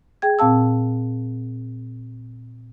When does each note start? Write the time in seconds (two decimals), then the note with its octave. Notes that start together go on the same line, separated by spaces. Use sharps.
0.22 G#4 G5 G#6
0.39 A#2 C4 F5 A5 E6